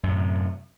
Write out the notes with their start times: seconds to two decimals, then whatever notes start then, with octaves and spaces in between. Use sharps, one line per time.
0.03 F#2
0.08 A2
0.12 D#3
0.17 C3